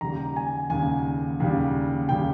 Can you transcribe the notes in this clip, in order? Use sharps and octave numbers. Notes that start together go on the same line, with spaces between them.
D#2 C#3 G3 A#5
G#5
D#2 C#3 G3 G#5
D#2 C#3 G3
D#2 C#3 G3 G5